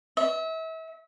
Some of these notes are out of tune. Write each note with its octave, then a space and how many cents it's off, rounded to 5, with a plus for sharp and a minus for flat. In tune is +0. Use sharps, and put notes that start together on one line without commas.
E5 -35